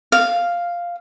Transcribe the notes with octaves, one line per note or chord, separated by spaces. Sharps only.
F5